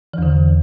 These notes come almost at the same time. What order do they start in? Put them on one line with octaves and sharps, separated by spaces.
E3 E2 D3